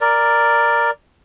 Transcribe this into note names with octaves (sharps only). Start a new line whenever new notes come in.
A#4 D5